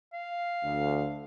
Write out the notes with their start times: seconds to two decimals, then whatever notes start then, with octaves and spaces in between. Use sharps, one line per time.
0.13 F5
0.63 D2